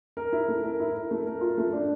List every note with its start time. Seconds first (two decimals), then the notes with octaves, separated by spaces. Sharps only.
0.17 A#4
0.33 E4
0.48 A3
0.64 A#4
0.80 E4
0.95 A#4
1.11 A3
1.26 A#4
1.41 F4
1.58 A3
1.73 D4